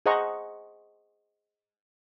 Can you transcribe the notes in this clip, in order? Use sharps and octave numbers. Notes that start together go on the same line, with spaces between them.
G#4 C5 D#5 F#5 A#5 C#6